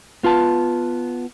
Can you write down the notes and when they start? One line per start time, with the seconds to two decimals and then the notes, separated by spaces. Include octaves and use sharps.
0.23 B3 F4 B4 A5